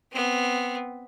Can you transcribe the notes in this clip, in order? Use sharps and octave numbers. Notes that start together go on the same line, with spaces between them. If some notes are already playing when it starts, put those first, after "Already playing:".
B3 C4